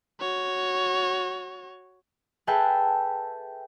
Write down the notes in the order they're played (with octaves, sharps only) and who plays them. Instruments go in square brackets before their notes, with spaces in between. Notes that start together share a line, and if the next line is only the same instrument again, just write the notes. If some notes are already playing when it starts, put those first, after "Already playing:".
[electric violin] F#4 C#5
[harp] G#4 A4 B4 E5 G5